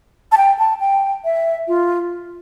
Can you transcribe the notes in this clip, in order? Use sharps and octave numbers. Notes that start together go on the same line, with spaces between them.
A5
G5
A5
G5
E5
F4